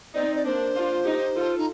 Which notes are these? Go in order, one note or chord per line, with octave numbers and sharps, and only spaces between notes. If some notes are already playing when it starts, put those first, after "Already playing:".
C4 D#4 D5
D5
A#3 D4 C5
D4 F4
D#4 G4
F4 A4
D#4